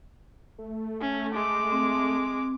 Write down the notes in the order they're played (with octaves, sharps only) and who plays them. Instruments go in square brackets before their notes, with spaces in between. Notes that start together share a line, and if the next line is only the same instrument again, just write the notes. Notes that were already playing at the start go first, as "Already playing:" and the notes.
[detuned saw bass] A3
[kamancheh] C#4
G#3 D6
[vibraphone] C4